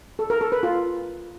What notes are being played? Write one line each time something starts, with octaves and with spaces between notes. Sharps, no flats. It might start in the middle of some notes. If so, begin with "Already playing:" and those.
A4
A#4
A4
B4
F4